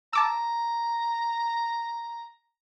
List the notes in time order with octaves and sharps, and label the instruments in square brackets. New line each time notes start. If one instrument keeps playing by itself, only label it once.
[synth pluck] A5 D6 E6 [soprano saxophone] A#5